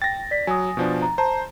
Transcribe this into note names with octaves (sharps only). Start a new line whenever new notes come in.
G5 A6 A#6
D5 B6
F#3 G#5 D#6
B2 F3 D4
A#5
C5 A5 A#5